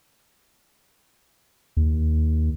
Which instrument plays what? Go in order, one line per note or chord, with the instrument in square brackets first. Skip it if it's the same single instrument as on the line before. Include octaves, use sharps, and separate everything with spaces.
[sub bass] D#2